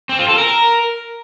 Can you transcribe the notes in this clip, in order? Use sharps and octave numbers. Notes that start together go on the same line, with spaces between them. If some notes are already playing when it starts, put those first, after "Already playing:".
C4
F4
A4
A#4